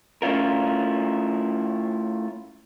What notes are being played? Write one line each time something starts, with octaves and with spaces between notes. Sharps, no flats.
A3 C#4 E4 F4 A#4